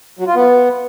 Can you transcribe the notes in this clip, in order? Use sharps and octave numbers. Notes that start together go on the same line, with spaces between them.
F#3
F4
B3